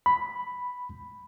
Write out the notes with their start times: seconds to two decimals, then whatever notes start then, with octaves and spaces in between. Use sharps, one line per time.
0.06 B5